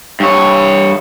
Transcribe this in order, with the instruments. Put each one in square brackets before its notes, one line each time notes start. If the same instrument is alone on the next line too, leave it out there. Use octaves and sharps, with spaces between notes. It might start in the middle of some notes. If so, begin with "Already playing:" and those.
[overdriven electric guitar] G2 C#5